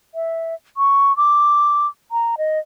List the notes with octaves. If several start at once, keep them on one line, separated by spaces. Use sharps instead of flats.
E5
C#6
D6
A#5
D#5